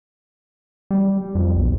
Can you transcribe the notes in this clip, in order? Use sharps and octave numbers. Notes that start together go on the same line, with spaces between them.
G3
F2
B1